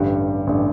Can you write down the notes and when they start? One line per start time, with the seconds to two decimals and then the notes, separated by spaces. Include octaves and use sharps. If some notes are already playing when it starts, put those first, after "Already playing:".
Already playing: A1 G2 D3 G3
0.47 A1 G2 D3 G3